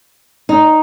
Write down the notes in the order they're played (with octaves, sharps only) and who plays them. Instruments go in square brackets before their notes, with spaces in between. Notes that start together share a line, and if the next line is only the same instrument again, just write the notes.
[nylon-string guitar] D#4